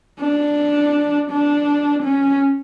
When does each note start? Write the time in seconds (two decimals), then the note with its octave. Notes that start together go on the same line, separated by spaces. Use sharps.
0.20 D4
1.31 D4
2.03 C#4